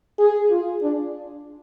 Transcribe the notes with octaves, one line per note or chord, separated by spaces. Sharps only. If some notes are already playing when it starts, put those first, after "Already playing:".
G#4
F4
D4